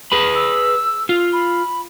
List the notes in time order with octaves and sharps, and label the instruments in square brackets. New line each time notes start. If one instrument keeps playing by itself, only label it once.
[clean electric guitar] G#4 B4 B5
[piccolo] E6
[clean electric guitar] F4
[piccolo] B5